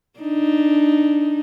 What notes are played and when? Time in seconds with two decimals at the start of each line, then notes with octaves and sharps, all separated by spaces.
0.19 D4 D#4